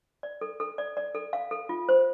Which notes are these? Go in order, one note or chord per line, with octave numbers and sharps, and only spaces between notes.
D5
A4
A4
D5
D5
A4
F5
A4
F4
C5